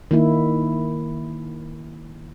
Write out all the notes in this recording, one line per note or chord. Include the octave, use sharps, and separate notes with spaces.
D#3 A#3 E4